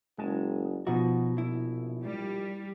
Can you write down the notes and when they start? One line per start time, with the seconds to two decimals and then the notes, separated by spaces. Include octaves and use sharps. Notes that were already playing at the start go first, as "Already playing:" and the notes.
0.18 F#1 G#3 G#5 A5
0.87 B2 F3 D#4 F#4
1.38 A#1 E4
2.04 G3